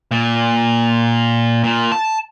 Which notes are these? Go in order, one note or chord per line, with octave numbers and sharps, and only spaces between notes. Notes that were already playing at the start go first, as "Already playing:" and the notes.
A#2
A#2
A5